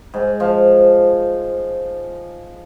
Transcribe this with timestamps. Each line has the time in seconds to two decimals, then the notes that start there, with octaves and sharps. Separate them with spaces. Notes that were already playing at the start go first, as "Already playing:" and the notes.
0.14 G#2
0.40 F3